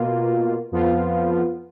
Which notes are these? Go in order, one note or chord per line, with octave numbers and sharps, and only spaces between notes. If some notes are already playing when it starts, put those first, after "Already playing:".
Already playing: B2 A#3 F4
F2 F3 B3 F4